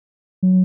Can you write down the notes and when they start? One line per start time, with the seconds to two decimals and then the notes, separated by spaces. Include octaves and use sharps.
0.43 F#3